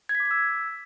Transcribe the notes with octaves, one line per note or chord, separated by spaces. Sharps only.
G#6
B6
D6
B6
E6